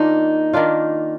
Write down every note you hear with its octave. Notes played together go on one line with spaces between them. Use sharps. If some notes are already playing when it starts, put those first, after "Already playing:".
Already playing: D#3 A#3 D4 D#4 F4
D#3 A#3 D4 F4